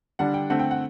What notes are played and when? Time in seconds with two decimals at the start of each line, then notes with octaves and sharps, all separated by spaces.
0.19 D3 G3 D4 F#5
0.34 G5
0.50 D3 A3 C4 F#5
0.60 G5
0.71 F#5